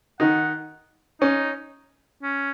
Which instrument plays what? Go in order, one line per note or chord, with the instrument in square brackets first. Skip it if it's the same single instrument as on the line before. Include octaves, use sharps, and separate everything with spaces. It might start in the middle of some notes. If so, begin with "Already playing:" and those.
[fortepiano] D#3 D#4 [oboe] F#5
[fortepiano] C#4 [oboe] D#4
[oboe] C#4